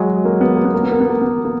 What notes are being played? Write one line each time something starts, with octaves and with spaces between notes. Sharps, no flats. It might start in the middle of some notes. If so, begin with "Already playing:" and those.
Already playing: F#3 G#3
A#3
B3
A#3
B3
A#3
B3
A#3
B3
A#3
B3
A#3